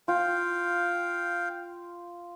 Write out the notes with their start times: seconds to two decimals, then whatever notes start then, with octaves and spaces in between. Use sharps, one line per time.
0.08 F4 F5 G5